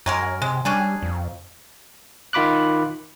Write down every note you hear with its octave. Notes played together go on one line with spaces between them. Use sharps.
F#2 F#3 G#3 A#4
C3 G#3
G3 C#4 D4 G#4
F2
D#3 F4 B5 D6 F#6